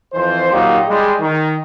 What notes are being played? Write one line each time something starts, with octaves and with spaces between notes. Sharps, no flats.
F2 E3 C5
A#2 F#3 A#3 D#4 G4
G3 G#3
D#3